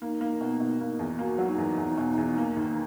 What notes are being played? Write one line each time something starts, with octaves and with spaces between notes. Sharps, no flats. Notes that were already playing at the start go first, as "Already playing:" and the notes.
A#3 D#4
A#3
B2
B2
A#3
E2
A#3 F#4
F#3
D#4
E2
E2
B2
E2
A#3
D#2